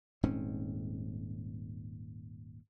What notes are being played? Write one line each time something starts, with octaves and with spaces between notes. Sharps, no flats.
D#1 G#2 C4 C#4